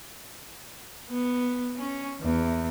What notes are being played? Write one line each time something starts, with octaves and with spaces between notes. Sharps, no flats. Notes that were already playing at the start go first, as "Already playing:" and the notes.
B3
C#4
E2